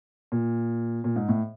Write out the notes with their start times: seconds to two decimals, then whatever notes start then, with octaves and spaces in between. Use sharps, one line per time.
0.32 A#2
1.04 A#2
1.16 G#2
1.29 A2